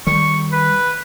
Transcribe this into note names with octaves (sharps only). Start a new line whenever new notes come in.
D#3 G3 C#6
B4